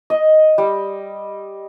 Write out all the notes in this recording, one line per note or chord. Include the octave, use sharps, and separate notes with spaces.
D#5
G3